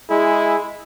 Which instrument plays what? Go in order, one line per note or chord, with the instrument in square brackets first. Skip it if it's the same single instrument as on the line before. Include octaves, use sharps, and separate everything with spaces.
[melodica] G#3 [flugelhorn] E4 [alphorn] G#4